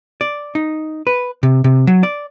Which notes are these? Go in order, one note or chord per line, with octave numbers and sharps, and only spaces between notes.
D5
D#4
B4
C3
C3
F#3
D5